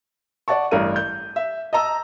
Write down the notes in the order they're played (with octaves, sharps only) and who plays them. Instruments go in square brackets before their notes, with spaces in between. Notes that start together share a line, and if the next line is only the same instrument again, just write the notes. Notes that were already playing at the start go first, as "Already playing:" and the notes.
[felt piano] D5 F#5 A5 C#6
A1 G2 A#4 D#7
G6
E5
D#5 A5 A#5 E6